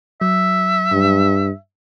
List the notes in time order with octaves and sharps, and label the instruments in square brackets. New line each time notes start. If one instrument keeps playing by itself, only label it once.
[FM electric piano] F#3 [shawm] E5
[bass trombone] G2